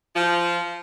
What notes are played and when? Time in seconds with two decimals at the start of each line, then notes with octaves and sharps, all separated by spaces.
0.14 F3